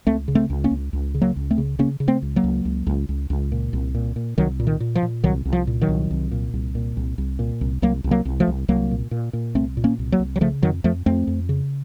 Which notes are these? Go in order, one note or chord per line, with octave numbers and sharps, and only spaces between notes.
C#2 A3 C4
C#3
A3 C4
C#2
A#3 C#4
C#2
C#2
C#3
F#3 A#3
C#2
A3 C4
C#3
C#3 A#3 C#4
C#3
A3 C4
C#2
F#3 A#3
C#2
C#2
C#2
C#2
C#2
A#2
C2
A#2
A#2
C2 D#3 F#3
A#2
D#3
A#2
F3
A#2
C2 D#3 F#3
C2
F3
A#2
D#3 F#3
C2
C2
A#2
C2
A#2
C2
C2
A#2
C2
C2 F#3 A#3
C2
F#3 A#3
C2
F3 A3
C2
C2 F#3 A#3
A#2
A#2
A#2
C2 A3 C4
A#2
A#3 C#4
C2
F#3 A#3
C2
F#3
C#3 F3 A3
F2 D#3 F#3
F2 F3 A3
F2 A3 C4
F2
C#3